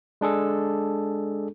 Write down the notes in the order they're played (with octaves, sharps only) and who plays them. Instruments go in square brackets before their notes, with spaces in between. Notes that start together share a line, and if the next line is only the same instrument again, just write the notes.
[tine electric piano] G#3 D4 G#4 A4